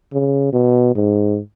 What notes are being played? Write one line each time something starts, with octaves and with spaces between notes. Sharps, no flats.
C#3
B2
G#2